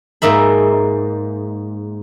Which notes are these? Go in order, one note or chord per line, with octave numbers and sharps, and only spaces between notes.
G#2 A#3 E5 B5